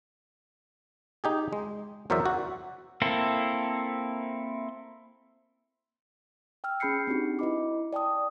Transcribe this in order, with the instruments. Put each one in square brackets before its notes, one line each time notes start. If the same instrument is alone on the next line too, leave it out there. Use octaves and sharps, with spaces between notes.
[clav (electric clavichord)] D#4 G4 G#4
G#3
E2 F#3 A#4 C5 D5 E5
F#4
[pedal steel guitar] A#3 C4 E4 A4
[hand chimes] G5 E6 F6
C#4 G#4 B5 G6 C7 C#7
C4 D4 D#4 F#4 G4
E4 B4 D#5 B5 D6
D5 G5 A5 D#6